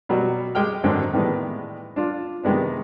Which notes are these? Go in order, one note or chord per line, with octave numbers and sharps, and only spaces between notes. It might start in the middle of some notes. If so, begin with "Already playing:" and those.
B2 F#3 G3
G#3 G4 G5 F6
G#2 D3 D#3 F#3 C4
A2 D#3 E3 G3 G#3 B3
D4 F4
C3 D#3 G#3 B3 D4